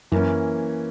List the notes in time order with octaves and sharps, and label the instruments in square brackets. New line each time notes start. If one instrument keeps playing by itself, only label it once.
[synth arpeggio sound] F#2 [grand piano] E3 A#3 C#4